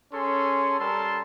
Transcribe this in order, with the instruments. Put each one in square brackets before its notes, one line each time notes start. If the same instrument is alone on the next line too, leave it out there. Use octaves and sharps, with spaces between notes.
[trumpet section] C#4 G#4 A4 C6
G3 A4 A#4 A5 C6